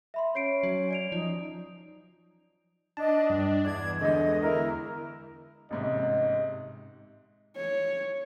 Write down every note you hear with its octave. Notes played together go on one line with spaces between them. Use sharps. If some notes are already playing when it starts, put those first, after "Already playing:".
E5 B5 C6
C#4 C#5 C7 D7
F#3
D5 D7 F7
F3 D#4
D4 D5 D#5 A5
G2
E2 D5 G#6
D3 G#3 D#5
E4 A#4
A1 G#2 C3 D#5
C#5